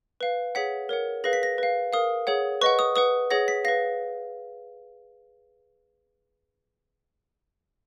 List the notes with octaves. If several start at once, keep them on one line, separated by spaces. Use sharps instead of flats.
B4 F5
G#4 C#5 F#5 B6
A#4 C#5 F#5
G#4 B4 F5 A#6
B6
A#6
B4 F5
A#4 F5 D#6
G#4 C#5 F#5
B4 D#5 F#5 C#6
D#6
B4 F#5 D#6
G#4 C#5 F#5 A#6
B6
B4 F5 A#6